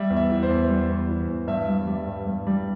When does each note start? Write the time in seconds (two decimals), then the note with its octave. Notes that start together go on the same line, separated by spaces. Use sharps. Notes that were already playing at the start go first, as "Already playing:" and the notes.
Already playing: G3 E5
0.10 E2
0.17 E5
0.30 E3
0.43 C5
0.49 E2
0.69 G3
0.89 E2
1.09 E3
1.28 E2
1.47 G2 E5
1.68 G3
1.87 G3
2.07 G2
2.27 G2
2.47 G3